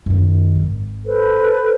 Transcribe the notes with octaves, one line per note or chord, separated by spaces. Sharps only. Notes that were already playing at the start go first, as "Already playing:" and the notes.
F#2 D#3
G#1
A4 B4 C5